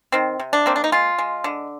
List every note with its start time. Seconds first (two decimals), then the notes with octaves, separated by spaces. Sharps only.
0.12 D#3 C4
0.39 C3
0.53 D4
0.66 A#3 C4
0.76 D4
0.84 D#4
0.92 G#3 F4
1.18 G#3
1.44 D3